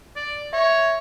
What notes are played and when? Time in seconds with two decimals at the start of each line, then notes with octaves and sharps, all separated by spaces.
0.16 D5
0.53 C#5 E5